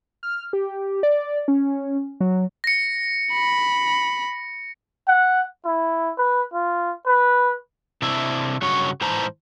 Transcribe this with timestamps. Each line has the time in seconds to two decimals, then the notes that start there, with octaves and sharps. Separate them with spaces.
0.23 F6
0.53 G4
1.03 D5
1.48 C#4
2.21 F#3
2.64 A#6 C#7
3.33 B5
5.08 F#5
5.65 E4
6.17 B4
6.53 F4
7.06 B4
8.02 C3 D4 E4
8.62 G2 C#3 F#4 C#5
9.01 G#2 E3 C5 A5 A#5